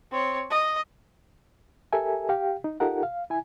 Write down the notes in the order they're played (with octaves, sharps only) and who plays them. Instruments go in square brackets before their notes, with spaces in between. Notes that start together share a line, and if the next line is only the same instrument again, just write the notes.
[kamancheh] C4 C#5
D#5
[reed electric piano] G4 A4 A#4 E5 G#5
G4 F5 G5
D#4
D#4 F4 G4 A4 A#4 F#5
F5
E4 G#5